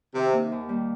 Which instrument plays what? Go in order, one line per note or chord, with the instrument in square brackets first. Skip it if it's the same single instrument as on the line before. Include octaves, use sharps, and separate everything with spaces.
[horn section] C3 [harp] D#3
[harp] A#3 D#4
D#2
D#3 G3 A#3